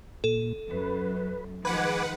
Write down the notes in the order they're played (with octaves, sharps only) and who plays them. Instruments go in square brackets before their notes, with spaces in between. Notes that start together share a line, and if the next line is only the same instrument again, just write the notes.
[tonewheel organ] A#2 [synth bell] A4
[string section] F#2 [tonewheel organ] B4
[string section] D#3 F3 G#3 [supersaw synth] B4 F#5 [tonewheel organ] G#5 D6 [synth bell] B5